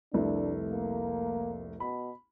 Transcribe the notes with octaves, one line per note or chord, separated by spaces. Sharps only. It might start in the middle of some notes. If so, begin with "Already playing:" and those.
F1 C2 A3 D4
A#3
B2 B5